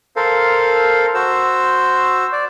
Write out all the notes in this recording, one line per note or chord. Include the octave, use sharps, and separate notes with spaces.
A4 A#4 C5 F5
F#4 C5 E6
D5